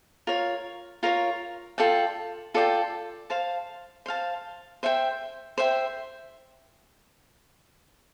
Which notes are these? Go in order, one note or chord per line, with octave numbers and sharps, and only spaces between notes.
F4 A#4 C#5
F4 A#4 C#5
F4 A4 D5 G5
F4 A4 D5 G5
C5 F5 A5
C5 F5 A5
C5 E5 G5
C5 E5 G5